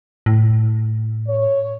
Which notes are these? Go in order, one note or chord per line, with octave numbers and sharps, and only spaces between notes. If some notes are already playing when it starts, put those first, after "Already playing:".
A2
C#5